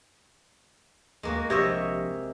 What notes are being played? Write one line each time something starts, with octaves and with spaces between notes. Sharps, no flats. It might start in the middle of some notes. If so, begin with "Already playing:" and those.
D#2 G#3 A#3 F#4
A#1 C3 C#5 D#5 E5